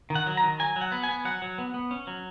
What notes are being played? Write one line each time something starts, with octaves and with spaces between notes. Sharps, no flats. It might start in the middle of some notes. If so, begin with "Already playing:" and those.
D#3
F#5
F#3
A#5
D#3
F#3 G#5
F#3
F#5
B3
G#5
B3
F#3 F#5
F#3
B3
B3
C#4
F#3